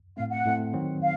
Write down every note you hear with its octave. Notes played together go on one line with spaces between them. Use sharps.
A2 A3 C4 F5
F#5
A2 A3 C4
D#3 F#3 C4 D#4
F5